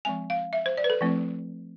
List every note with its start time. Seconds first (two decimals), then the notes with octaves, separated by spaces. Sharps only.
0.05 F3 G#3 C4 G#5
0.30 F5
0.53 E5
0.66 C5
0.77 D5
0.84 B4
0.90 A4
1.01 F3 A3 C4 E4